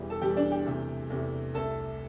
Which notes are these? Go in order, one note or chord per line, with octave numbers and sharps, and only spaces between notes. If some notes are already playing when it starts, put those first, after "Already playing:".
Already playing: E1 E2 E3 G3
A4 A5
E1 E2 E3 G3 G4 G5
D4 D5
G4 G5
E2 C3 A3
E2 C3 A3
C2 C3 A3 A4 A5